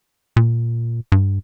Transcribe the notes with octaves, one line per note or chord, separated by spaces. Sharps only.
A#2
G2